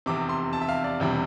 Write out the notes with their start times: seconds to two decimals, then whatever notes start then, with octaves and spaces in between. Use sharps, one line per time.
0.06 F1 E2 C3 D6
0.29 C6
0.53 A5
0.61 E5
0.69 F5
0.84 D5
1.00 E1 E2 C3 G3